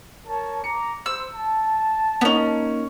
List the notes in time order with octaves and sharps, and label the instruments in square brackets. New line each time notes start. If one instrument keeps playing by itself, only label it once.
[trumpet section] A#4 C#5 A5
[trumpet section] A#5 D6 [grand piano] C#7
[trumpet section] C5 [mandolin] E6
[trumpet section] A5
[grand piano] A#3 D#4 [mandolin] B3 C#4